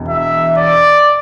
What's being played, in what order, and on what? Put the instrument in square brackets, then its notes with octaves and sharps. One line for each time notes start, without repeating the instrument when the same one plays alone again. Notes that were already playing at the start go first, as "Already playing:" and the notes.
Already playing: [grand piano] E1 E2
[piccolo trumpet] E5
D5